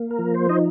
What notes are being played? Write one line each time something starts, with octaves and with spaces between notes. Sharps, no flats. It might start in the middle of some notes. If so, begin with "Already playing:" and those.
Already playing: A#3
A#4
F3
C5
D#4 D#5